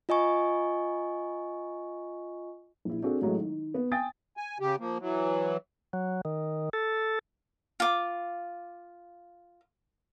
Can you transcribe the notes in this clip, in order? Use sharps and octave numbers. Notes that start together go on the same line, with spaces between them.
F4 D#5 G#5 C#6
A#1 E4
C4 D4 F#4 G#4 A4
A1 F#3 G#3 A3
D#3
B3
G5 G#5 D#6 A6
G#5
C#3 G4
F3 A#3
E3 F#3
F#3
D#3
A4
F4 D6